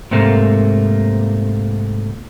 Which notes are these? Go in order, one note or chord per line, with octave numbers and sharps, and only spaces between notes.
G#2 C3 A3 A#3